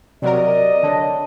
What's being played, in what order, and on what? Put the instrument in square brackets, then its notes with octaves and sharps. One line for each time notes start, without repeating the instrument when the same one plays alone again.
[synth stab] C3 F#3 A#4 [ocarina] D5 [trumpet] D#5
[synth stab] D3 [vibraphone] C#5 A5